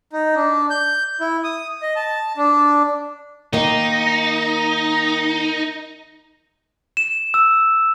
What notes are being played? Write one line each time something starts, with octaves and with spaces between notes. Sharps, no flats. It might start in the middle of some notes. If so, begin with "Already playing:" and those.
D#4
D4
G6
E4
D#6
D#5
A5
D4
D#3 A#3 D#4
E7
E6